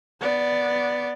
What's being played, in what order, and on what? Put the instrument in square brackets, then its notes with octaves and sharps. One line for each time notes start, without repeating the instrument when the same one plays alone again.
[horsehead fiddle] B3 D5